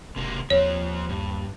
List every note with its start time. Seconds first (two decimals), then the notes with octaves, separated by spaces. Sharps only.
0.16 E1 C3 A#3
0.50 D#2 F3 C4 C#5
1.09 G2